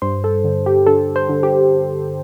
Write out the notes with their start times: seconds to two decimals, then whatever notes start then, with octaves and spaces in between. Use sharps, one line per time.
0.02 G2 C5
0.24 A4
0.44 D3
0.66 G4
0.86 D3 A4
1.16 C5
1.29 D3
1.43 G4